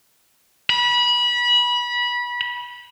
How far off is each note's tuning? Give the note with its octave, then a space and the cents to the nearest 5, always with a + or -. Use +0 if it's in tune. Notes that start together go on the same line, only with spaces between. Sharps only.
B5 -25